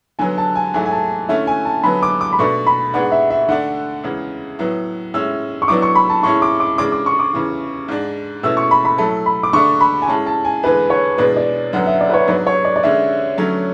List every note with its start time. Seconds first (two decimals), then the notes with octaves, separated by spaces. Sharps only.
0.19 D3 F#3 B3 G#5
0.38 A5
0.55 G#5
0.74 G#2 F#3 A3 E4 G#5
0.86 G#5
0.92 A5
1.29 D3 A3 C#4 E4 E5
1.47 G#5
1.65 A5
1.83 D3 F#3 B3 B5
2.03 D6
2.21 D6
2.32 B5
2.39 B2 A3 D4 C#6
2.66 B5
2.94 G#2 G#3 B3 D4 F#5
3.12 E5
3.30 E5
3.49 D3 A3 D4 F#5
4.04 E2 C#3 G#3
4.59 A2 F#3 B3
5.14 A2 G#3 C#4 E4 E6
5.62 C#6
5.68 A2 F#3 B3 D4 D6
5.82 C#6
5.95 B5
6.09 A5
6.23 A2 G#3 C#4 E4 C#6
6.42 D6
6.60 D6
6.78 C#3 E3 G#3 D4 D6
6.92 D6
7.06 C#6
7.19 D6
7.33 E2 C#3 E3
7.88 G#2 G#3 D4
8.43 B2 A3 C#4 E4 E6
8.57 C#6
8.71 B5
8.85 B5
8.98 A2 F#3 A3 A5
9.26 B5
9.43 D6
9.53 D3 A3 D4 C#6
9.81 B5
10.02 G#5
10.08 A2 G#3 C#4 A5
10.26 A5
10.45 G#5
10.63 E2 D3 G#3 B4
10.90 C#5
11.18 E2 B2 G#3 B3 D4 B4
11.36 D5
11.73 F#2 D3 F#3 B3 F#5
11.87 E5
12.00 D5
12.10 B4
12.14 C#5
12.28 G#2 F#3 B3 D4 B4
12.47 C#5
12.64 D5
12.76 D5
12.83 D3 G#3 C#4 E5
13.38 D3 F#3 A3 C#4